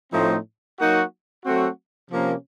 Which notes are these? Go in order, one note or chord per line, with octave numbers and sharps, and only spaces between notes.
A2 F3 A3 C4 D#4
F#3 A#3 D#4 F#4
F#3 A3 C4 F#4
C3 F3 A#3 C#4